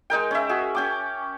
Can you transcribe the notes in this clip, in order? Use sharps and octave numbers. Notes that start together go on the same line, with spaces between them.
G#3 D#4 A#4 G5
C#4 E5
F#4 G#4
C#4 G5 D6